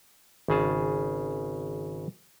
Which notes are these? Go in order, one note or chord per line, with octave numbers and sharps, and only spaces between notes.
G#1 C#3 G#4 A5